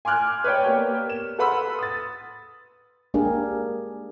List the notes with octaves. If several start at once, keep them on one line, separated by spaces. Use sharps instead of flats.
G#5 C6 D6 F6 F#6 G#6
B4 C#5 D5 G5
A#3 B3 G4 C#5 G5
E7
A4 B4 F#5 B5 C6 E6
D#6 A6
G#3 A#3 D4 G4 G#4 A#4